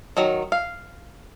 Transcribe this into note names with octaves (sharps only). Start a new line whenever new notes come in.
D#3 F#3
F5